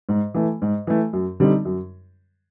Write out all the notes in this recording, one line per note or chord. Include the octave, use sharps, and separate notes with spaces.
G#2
E3 A3
G#2
E3 A3
F#2
D3 G3 C4 D#4
F#2